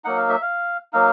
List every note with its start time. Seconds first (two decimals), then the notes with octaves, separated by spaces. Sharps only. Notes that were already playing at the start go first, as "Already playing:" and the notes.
0.04 F#3 A#3 D#4 F#5
0.17 F5
0.29 E5
0.42 F5
0.93 F#3 A#3 D#4 F5